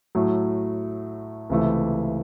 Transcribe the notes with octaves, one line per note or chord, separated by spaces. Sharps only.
A2 F#3 A3
C#2 C3 E3 A3